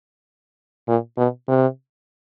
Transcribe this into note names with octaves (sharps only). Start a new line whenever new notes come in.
A#2
B2
C3